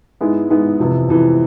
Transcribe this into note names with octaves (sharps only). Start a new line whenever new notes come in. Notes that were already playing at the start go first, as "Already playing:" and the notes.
G#2 G#3 B3 E4
G#2 G#3 B3 E4
F2 C3 E3 B3 E4
F2 C3 E3 B3 E4